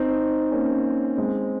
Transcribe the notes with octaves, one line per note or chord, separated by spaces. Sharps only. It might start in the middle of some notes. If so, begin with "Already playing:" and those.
Already playing: C4 D#4
A#3 C#4
G#3 C4